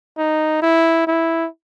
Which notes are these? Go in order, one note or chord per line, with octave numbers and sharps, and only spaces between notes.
D#4
E4
E4